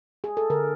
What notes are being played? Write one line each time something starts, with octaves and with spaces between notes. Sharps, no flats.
G#4
A4
D3 A#4